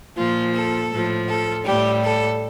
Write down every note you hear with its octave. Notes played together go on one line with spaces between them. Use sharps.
A#2 F3 F4
A4
A2 F3
A4
A2 G3 G4
A4